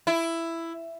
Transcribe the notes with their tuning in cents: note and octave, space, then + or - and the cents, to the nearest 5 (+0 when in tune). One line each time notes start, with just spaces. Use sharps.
E4 +10